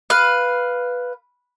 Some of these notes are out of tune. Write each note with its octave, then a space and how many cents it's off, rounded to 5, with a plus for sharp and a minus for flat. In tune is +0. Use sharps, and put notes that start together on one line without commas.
B4 +0 F5 +0